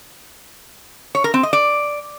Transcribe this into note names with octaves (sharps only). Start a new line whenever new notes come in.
C#5
A#4
C4
D#5
D5